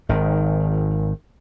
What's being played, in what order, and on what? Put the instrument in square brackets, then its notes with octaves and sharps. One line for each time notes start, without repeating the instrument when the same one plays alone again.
[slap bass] G#1 D#3